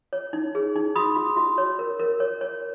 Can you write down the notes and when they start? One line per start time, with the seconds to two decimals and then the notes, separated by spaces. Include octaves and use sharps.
0.13 C#5
0.33 D#4
0.55 G#4
0.76 D#4
0.96 F#4 B5 D#6
1.16 F#4
1.37 F#4
1.58 C#5
1.79 A#4
1.99 A#4
2.20 C#5
2.41 C#5